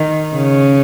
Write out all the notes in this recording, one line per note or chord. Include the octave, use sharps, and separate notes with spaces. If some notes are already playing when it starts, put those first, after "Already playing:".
Already playing: D#3
C#3